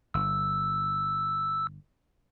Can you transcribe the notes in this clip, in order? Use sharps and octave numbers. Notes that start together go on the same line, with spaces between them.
G1 E6